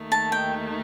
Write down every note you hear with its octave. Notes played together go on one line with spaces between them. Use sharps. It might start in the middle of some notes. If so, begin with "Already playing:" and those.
Already playing: D#2 D#3 A3 D#4
A5
G5